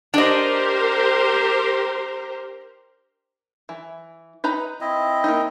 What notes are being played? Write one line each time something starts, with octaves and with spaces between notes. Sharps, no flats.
D4 G4 A#4 C5 D#5
E3
D#4 B4 A#5
C4 E4 D#5
A#3 D#4